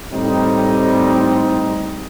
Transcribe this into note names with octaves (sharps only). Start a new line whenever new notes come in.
A2 G3 C4 D#4